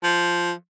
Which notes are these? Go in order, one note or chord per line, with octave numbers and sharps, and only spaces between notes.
F3